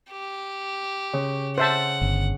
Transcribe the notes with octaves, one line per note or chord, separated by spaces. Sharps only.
G4
C#3
C5 E5 F#5 A5
G1